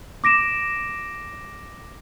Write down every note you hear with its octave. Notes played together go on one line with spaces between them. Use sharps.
D6 A#6 D7 E7